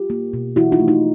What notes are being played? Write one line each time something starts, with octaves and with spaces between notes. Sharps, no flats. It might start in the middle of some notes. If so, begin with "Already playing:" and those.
Already playing: F4 G4
A#3
B2
E3 E4 F#4
D#4 F4
A3
D#4